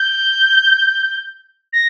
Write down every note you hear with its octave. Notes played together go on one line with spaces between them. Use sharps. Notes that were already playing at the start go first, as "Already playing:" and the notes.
Already playing: G6
A#6